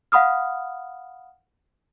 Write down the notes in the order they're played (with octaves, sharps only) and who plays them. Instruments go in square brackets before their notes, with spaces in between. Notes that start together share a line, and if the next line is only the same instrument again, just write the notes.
[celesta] F5 F#5 B5 D#6 F6